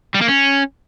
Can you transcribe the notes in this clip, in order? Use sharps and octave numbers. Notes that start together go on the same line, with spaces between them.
G3
A#3
C#4